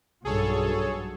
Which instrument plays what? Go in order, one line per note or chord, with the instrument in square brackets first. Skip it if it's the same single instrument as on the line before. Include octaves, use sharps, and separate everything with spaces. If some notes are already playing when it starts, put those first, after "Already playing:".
[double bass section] B1 G2 F#3 [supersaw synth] G#4 A4 C#5